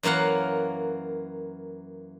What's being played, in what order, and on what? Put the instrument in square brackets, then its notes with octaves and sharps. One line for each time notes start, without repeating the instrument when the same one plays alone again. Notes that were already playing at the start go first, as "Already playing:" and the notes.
[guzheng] F#2 E3 A#3 F5 F#5